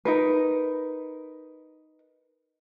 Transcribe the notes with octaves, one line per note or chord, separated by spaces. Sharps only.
D#4 A#4 B4